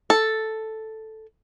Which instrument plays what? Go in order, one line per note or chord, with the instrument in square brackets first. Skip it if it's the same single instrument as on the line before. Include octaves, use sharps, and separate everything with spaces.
[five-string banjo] A4